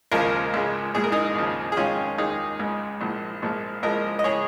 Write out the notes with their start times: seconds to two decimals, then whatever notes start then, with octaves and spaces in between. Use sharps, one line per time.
0.12 D#2 C#3 F3 G#3 F4 A#4
0.54 C#2 C#3 G#3
0.94 A#1 A#2 G#3 G#4
1.04 A#4
1.12 D#4 G#4
1.35 D#2 C#3 F3
1.72 G#4
1.77 F2 D#3 G#3 C#4 F4
2.18 D#2 D#3 G#3 D#4 G#4
2.59 C#2 C#3 G#3
3.01 A#1 A#2 F3 G#3
3.42 A#1 A#2 F3 G#3
3.83 C#2 C#3 F3 G#3 A#4 D#5
4.19 D#5
4.24 C#3 G#3 G#4 C#5